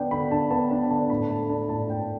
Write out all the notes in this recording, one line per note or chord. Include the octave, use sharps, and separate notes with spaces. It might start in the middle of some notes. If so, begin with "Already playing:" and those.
Already playing: D3 B3 D4 G5
D3 B5
D3 A5
B3 A5
D4 B5
D3 A5
A2 B5
A3 A5
D4 A5
A2 A5
A2 G5